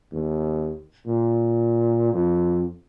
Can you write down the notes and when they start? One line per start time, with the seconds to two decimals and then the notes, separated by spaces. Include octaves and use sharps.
0.12 D#2
1.06 A#2
2.13 F2